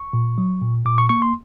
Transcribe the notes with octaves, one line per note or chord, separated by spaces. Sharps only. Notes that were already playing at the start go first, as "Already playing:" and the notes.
Already playing: C#6
A#2
F#3
A#2
A#2 D6
C#6
A#3 C#6
C6